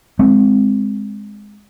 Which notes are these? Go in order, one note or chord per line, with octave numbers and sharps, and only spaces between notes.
G#3 C4